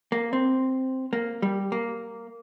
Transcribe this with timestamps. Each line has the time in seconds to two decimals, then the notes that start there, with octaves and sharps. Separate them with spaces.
0.12 A#3
0.33 C4
1.13 A#3
1.42 G3
1.72 A#3